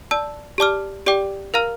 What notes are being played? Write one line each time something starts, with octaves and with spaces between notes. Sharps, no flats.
D5 A5 E6
G4 D5 A5 D6 F6
G4 D5 G5 D6
A#4 F5 A#5 F6